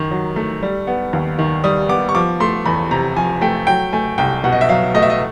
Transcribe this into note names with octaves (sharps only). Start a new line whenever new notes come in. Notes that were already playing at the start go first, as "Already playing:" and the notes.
Already playing: F#2 D#3
F#3
A3
G3
B3
D#2
D#3
G3 D#6
B3 D6
C#6
F3 D6
A3 C6
E2 B5
C3 A#5
F3 G#5
A3 G5
F#3 G5
A3 G#5
C2 G5
B2 F#5
D#5
E5
F#3 F5
A3 D#5
E5
D#5